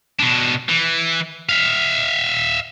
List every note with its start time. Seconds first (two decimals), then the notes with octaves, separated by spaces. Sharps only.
0.20 B2 D4
0.69 E3
1.49 E5 F5